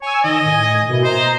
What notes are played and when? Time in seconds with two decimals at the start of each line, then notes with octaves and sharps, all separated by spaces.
0.02 C#5 G#5 E6
0.24 D#3 D#5
0.42 A2 G#5
0.88 B2 A#3 E4
1.04 C5 D#5 A#5